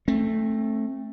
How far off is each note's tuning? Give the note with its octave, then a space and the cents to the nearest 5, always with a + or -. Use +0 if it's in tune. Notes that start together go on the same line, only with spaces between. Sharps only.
A3 +0 C4 +35